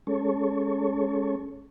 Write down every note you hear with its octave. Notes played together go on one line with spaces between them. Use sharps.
G#3 C#4 A4 C#5